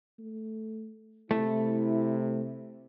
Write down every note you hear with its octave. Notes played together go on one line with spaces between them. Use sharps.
A3
C3 A3 E4